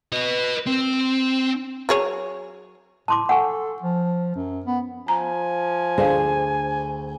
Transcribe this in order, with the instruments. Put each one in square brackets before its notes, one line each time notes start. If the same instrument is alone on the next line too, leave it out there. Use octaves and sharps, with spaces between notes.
[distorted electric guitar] B4 D#5
C4
[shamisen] F#3 G#4 C#5
[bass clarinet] A2 [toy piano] A5 C6 D6
[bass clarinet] A4 [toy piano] F#5 G#5 C#6
[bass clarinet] F3
F#2
B3
[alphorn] F3 [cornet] G#5 [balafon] A#5
[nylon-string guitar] D2 G#4 C5 [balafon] D5 F5